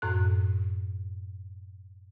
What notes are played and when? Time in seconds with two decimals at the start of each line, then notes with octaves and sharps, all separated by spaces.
0.02 F#2 A2 F#6